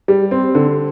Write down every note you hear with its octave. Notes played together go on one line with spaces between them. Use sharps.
G3
C4
D3